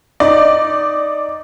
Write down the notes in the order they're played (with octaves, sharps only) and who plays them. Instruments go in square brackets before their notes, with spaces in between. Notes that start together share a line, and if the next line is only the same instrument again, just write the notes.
[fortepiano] D#4 [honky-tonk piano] D5